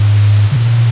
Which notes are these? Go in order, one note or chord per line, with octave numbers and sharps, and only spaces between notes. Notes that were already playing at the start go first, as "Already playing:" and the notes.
Already playing: G#2
C#3
A#2